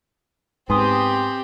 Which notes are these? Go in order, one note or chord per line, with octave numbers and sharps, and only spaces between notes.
G#2 B3 C4 G4 G#5 C6 D#6